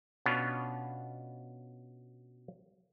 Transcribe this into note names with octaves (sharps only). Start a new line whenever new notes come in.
B2 B3 C#4 D4 F4